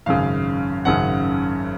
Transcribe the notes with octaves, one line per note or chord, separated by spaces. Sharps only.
G#1 F#2 C#3 F5
G#1 F#2 C#3 F#5